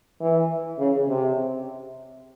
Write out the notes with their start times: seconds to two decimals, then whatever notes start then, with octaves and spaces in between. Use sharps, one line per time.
0.21 E3
0.79 C#3
1.07 C3